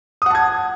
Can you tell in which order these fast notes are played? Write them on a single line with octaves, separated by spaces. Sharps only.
D#6 F#5 A5 G#6